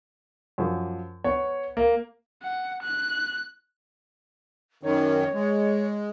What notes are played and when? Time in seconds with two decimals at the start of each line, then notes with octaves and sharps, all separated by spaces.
0.58 F#2 F3
1.24 B3 C#5
1.77 A#3
2.43 F#5
2.83 F#6
4.83 F#2 D#3 C#5
5.34 G#3